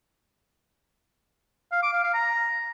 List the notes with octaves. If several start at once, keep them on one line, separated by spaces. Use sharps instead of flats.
F5
D6
F5
F5
A#5